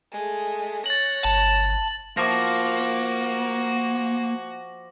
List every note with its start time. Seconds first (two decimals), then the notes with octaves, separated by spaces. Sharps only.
0.13 G#3 A3 G#4
0.86 C#5 F#6 A6 A#6 F#7
1.24 G1 A5
2.17 F3 A#3 F#4 D6 A#6